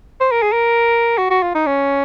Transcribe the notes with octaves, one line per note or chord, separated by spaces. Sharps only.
C5
A#4
G#4
A#4
F#4
F#4
F4
D#4
C#4